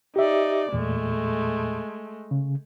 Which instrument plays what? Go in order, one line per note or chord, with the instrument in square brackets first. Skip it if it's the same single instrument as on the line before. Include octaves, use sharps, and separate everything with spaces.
[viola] D#4 D5 [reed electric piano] G4 E5
[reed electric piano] E2 A#2 [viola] G#3 A3
[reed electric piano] C#3